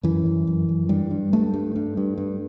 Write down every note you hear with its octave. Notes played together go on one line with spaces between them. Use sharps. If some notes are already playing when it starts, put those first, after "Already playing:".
F#2 E3
F#2
F#2
F#2
G2 G3
G2
G2 A3
G2
G2
G2
G2